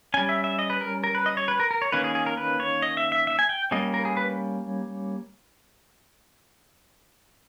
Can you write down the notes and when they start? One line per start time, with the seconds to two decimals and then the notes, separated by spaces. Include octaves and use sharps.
0.14 G3 C#4 G#5
0.29 E5
0.44 E5
0.59 D#5
0.70 B4
0.81 A#4
1.04 A#4
1.15 B4
1.26 D#5
1.37 C#5
1.48 B4
1.60 A#4
1.71 A#4
1.82 C#5
1.92 D#3 A#3 C#4 B4
2.04 G#4
2.15 G#4
2.26 A#4
2.37 B4
2.60 C#5
2.82 D#5
2.97 E5
3.12 E5
3.27 E5
3.39 G#5
3.49 G5
3.71 G3 A#3 C#4 D#5
3.94 A#4
4.05 G#4
4.17 B4